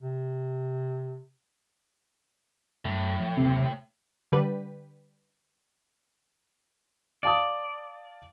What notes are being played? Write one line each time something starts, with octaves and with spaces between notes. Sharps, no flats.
C3
F#2 A2
F3
F#1 D#2 C3 C4
D3 G3 B4
D5 F5 A5 D#6